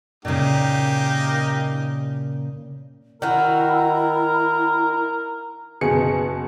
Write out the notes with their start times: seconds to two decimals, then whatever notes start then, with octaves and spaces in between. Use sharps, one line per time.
0.25 A#2 C#3 A#3 D#4 G4
3.22 D#3 E4 F#4 A#4
5.81 F#1 B2 G#4 C#7